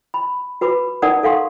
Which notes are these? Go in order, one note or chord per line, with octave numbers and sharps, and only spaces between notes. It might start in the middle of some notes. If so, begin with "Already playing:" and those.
B5
F#4 B4 B5 D6
D#4 A#4 D5 F#5 A5 D#6
A4 F5 F#5 C6 C#6